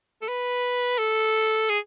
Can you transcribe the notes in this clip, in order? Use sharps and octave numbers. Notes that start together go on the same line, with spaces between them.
A4
B4
A4
G#4